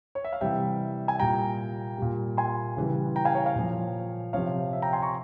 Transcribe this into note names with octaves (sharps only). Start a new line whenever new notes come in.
C#5
E5
F5
C3 E3 G3 E5 G5
G#5
A#2 G3 G5 A#5
A#2 G3
G#5 C6
C#3 E3 G3
G5 A#5
F5 G#5
C#5
C#5 F5
A#2 F3
C3 F3 C#5 F5
E5
G5 A#5
G#5 C6
A#5 C#6